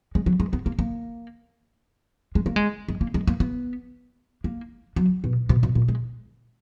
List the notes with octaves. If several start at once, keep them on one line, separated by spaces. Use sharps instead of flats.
G#3
F#3
G#3
B3
A#3
A#3
G#3
A#3
G#3
G#3
A#3
G#3
A#3
B3
A#3
F#3
B2
B2
B2
A#2
G#3